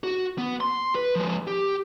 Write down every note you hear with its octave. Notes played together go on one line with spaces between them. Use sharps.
F#4
B3
C6
B4
F3 G#3
G4